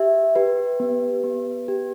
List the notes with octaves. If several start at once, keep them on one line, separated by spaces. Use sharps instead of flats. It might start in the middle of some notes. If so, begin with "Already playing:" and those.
Already playing: G4 E5
G4 B4
B3
B3
G4